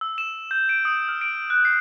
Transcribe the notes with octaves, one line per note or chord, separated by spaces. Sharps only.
E6
E7
G6
D7
D#6
F6
D7
F#6
C7